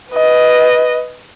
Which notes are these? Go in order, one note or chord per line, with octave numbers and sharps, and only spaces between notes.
B4 D#5